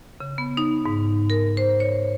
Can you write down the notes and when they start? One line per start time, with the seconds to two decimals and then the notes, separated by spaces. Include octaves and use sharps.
0.20 C#3
0.38 B3
0.57 D#4
0.86 G#2
1.30 A#4
1.57 C5
1.80 C#5